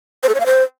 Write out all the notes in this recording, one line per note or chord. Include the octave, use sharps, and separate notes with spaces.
C5
A4
C#5
F5
C5